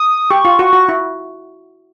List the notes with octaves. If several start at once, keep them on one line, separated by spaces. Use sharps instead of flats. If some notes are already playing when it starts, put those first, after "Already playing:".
Already playing: D#6
G4 C#6
F4
F#4
F#4
E4